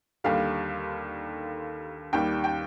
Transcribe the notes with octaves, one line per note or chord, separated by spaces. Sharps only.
D#2 D3 G3 F5
D#2 D#3 G3 G5
G5